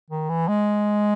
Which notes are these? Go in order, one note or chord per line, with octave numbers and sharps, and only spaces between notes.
D#3
E3
G#3